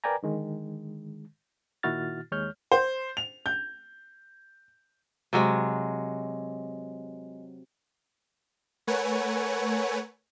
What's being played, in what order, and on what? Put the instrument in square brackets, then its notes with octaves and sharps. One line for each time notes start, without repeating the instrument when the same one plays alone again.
[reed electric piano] A#4 B4 D5 G5 G#5 A#5
D3 D#3 G#3
A#2 D#3 E4 F#4 F6 A6
D#2 G#3 C#5 F6 G6
[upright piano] C5
F7
G6
[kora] C3 F#3 G#3
[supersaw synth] A3 A#4 B4 C#5 F#5 G#5